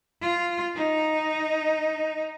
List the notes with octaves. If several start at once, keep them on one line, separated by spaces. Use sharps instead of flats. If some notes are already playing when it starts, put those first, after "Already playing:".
F4
D#4